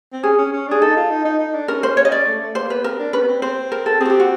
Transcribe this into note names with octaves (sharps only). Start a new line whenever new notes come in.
C4
C#4 G#4
C#4
C#4
D4 G#4
D#4 A4
F4
D#4
D#4
D#4
D4
C#4 A#4
C5
C#5
D#5
D5
A3
A3
A#3 C5
B3 B4
C4 A#4
D4
C#4 B4
B3
C4
C4 C5
A#4
A4
C4 F#4 G#4
G4
F#4